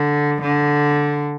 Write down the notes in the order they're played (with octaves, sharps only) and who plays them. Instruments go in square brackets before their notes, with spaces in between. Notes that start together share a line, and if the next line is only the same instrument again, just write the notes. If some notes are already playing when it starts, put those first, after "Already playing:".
Already playing: [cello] D3
D3